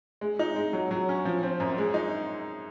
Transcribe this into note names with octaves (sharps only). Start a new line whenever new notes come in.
G#3
D#4
G#3
F#3
F#3
C#4
F3
C4
F#2
G#3
D#4